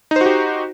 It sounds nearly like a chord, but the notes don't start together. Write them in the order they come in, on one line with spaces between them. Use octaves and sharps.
D#4 C5 F#4 G4